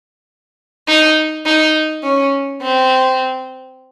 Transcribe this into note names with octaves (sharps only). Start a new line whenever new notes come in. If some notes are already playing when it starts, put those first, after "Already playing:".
D#4
D#4
C#4
C4